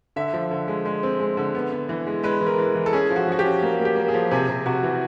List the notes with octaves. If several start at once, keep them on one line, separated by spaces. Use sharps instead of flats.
D3 E5
F3
D3
G#3
G#3
C4
G#3
D3
B3
B3
E3
G#3
G#3 B4
E3
A#4
E3
E3
A4
C#4 G#4
F3
F#4
F3 F#4
G4
C#4
A#3
A#3
G4
A#3
G#4
F3
C3 G#4
C3
C3 F#4
E3